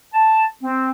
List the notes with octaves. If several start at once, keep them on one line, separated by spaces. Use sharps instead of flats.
A5
C4